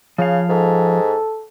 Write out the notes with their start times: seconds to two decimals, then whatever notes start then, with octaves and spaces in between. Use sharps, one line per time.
0.18 C#3 F3 F5
0.49 G#2 A4